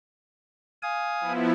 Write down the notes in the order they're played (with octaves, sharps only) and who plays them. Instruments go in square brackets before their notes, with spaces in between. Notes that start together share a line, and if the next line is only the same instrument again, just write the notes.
[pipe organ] F5 G#5 D#6
[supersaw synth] F3 B3 E4